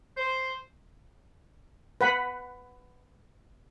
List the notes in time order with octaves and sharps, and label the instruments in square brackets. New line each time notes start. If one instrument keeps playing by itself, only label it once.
[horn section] C5
[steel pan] B4 F#5 B5